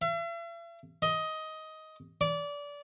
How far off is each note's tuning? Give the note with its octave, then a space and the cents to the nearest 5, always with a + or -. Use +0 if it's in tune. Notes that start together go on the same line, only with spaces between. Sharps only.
E5 +45
D#5 +15
D5 -25